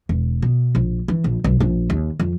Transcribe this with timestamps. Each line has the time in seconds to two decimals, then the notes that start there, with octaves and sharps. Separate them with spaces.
0.09 E1
0.42 B2
0.75 A#1
1.08 E3
1.24 A#1
1.44 B1
1.60 A#1
1.90 D#2
2.20 F2